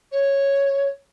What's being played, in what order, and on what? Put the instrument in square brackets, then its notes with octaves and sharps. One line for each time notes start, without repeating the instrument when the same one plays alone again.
[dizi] C#5